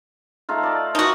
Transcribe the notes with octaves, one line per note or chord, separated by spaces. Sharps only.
A3 D#4 F4
D5 A5
D#4 F#4